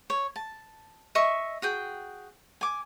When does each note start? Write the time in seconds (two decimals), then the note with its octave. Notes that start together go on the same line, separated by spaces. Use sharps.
0.10 C#5
0.36 A5
1.15 D#5 E5 C#6
1.62 F#4 G#4 G5
2.61 G#5 D6